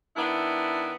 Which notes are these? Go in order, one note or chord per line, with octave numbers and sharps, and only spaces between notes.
D#3 B3 D4 E4